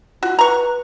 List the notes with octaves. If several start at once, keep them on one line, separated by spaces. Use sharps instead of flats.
F4 F#4
B4 A#5 C#6